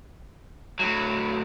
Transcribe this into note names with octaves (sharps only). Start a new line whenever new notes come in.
A2 F#3